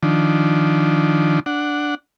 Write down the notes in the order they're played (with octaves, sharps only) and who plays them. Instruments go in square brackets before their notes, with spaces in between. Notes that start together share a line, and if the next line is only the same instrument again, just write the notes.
[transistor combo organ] D#3 F3 D4
D4 F#5